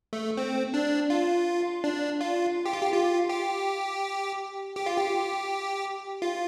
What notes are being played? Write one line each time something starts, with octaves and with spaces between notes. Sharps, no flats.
A3
C4
D4
F4
D4
F4
G4
F4
G4
F4
G4
G4
F4
G4
F4